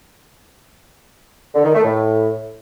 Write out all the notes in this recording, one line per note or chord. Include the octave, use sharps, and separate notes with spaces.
D3
D#3
A3
A2